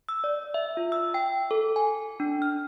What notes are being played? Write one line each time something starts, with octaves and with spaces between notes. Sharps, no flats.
E6
D5
E5
F4
E6
G5
A4
G#5
D4
F6